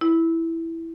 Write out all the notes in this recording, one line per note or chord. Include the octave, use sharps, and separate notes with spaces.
E4